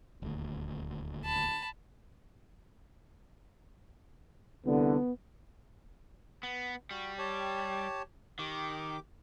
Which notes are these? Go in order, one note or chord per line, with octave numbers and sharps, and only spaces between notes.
D#1 D2
A5 B5
C2 D3 B3
B3
G3 F#4
G4 C#5 A5
D#3 G4 D6